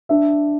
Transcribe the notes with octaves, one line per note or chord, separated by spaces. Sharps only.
D4 E5